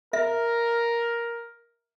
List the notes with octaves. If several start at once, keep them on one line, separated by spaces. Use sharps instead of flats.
A#4 E5